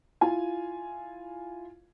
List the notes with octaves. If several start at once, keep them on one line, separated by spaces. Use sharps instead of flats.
E4 F4 G#5